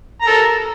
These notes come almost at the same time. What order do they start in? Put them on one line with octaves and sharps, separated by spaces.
A#5 A#4 A4